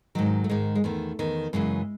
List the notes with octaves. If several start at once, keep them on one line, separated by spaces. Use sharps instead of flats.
G#2 D#3 F#3
A3
G#2 D#3 G#3
G#3
E2 D#3 A3
E2 D#3
F#2 C#3 E3 G#3